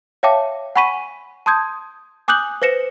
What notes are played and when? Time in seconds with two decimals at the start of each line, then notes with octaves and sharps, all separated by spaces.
0.23 C#5 E5 F5 G5 A5 D6
0.76 F#5 G#5 B5 C#6 B6 D#7
1.46 A5 C6 D#6 G6 G#6
2.28 G#5 D6 D#6 F#6 G6 F#7
2.62 B4 C5 A#6 C#7 E7